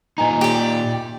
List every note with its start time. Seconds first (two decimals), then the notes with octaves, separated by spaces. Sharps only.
0.18 A#2 D#4 D#5 G#5 A#5
0.41 G4 D5